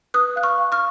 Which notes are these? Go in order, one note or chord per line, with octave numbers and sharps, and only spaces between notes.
B4 D#6 F#6
F5 F#6
C#6 F6
F5
C#6 F6